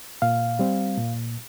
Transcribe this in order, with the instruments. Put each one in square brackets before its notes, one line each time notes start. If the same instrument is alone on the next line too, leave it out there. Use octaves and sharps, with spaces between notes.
[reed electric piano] A#2 F5
G3 C4
A#2